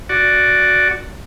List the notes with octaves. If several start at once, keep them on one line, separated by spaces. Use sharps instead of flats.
F#4 D5